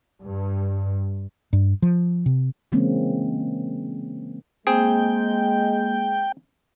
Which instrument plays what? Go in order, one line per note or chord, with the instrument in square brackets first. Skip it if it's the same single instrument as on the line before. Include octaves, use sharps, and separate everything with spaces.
[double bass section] G2
[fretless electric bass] G2
F3
C3
[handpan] C#3 E3 G#3 A#3 C4 C#4
[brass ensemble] G#3 [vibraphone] A#3 [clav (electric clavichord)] C4 G#4 [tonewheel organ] G5